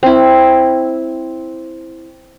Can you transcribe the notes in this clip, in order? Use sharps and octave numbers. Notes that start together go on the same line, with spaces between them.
C4 E4